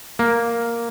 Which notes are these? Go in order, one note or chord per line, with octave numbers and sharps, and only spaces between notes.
A#3